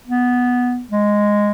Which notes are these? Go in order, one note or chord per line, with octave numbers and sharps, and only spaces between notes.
B3
G#3